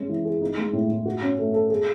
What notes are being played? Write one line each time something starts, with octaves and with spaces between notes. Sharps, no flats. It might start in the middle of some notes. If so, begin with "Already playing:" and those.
Already playing: G#3 C#4
E3
G#4
D#4
G#3
A2
A2
F#4
C#4
A3
A4
G#4